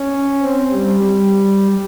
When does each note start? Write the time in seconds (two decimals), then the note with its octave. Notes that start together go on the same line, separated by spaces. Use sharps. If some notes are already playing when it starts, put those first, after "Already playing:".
Already playing: C#4
0.42 C4
0.72 G3
1.03 G3